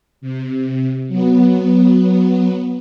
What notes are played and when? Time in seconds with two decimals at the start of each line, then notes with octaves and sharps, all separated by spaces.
0.21 C3
1.08 F#3 B3